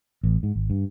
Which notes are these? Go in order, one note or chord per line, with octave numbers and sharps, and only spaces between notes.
A1
G#2
G#1
G2